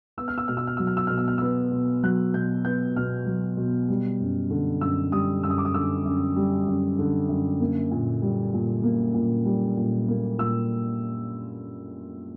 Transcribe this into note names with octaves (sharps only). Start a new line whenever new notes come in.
B3 E6
F6
E6
B2 F6
E6
F6
F#3 E6
F6
E6
B2 F6
E6
F6
B3 E6
B2
F#3 F#6
B2 G6
B3 G6
B2 F6
F#3
B2
G3
F#2
D3
F#2 E6
G3 D#6
F#2 E6
D#6
D6
D#6
D3 E6
F#2
G3
F#2
D3
F#2
A#3
A#2
G3
A#2
A#3
A#2
G3
A#2
A#3
A#2 E6